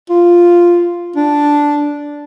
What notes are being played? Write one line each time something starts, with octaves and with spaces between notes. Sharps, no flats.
F4
D4